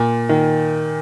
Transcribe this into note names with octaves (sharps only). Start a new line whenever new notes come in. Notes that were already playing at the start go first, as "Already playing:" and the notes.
Already playing: A#2
D#3